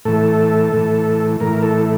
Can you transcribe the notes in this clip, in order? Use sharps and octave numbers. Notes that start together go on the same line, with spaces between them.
A2 E3 A4
A2 E3
A2 E3 A#4
A4